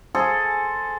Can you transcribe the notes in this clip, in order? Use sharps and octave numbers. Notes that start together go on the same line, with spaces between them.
G#4 A4 C5